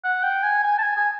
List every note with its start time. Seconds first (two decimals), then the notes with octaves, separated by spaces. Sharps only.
0.04 F#5
0.23 G5
0.43 G#5
0.64 G#5
0.78 A5
0.83 G#5
0.96 G#5